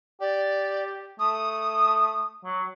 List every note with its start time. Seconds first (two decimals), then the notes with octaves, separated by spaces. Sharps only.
0.21 G4 D5
1.20 A3 D#6
2.44 F#3